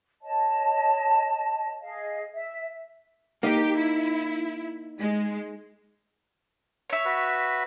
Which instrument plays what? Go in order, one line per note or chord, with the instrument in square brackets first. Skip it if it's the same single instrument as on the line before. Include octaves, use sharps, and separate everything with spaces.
[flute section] C#5 D#5 A5
G#4 D#5 F5
E5
[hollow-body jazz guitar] A#3 D#4 [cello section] G4
[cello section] E4
G#3
[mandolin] C#5 E5
[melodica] F#4 B4